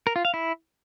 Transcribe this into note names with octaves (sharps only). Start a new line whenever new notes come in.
A#4
F4
F5
E4